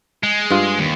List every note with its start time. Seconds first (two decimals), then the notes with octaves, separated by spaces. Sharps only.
0.23 G#3
0.51 G2 F4
0.79 D#2